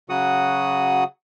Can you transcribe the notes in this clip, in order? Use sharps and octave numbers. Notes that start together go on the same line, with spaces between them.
C#3 F#3 F#4 F#5 D#6